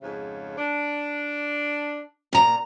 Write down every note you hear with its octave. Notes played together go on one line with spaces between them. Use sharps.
F2 G#2 C#3
D4
A#2 A#5